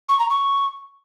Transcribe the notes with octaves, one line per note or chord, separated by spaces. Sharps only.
C#6
A#5
C#6